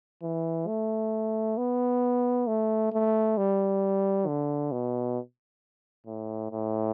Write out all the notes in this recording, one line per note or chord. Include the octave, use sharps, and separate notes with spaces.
E3
A3
B3
A3
A3
G3
D3
B2
A2
A2